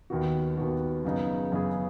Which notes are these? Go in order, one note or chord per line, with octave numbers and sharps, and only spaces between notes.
D#2 D#3 B3 F#4
D#2 D#3 B3 F#4
F#2 C#3 B3 D#4 G#4
F#2 C#3 B3 D#4 G#4